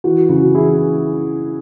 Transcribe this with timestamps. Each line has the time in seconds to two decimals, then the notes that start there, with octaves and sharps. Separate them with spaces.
0.04 E3 F#4
0.29 C#3 F#4
0.54 E3 E4 G#4